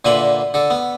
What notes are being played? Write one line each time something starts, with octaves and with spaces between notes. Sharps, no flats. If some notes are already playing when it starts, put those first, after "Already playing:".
A#2 D3 B4 E5 B5 C6
D3 A4
B3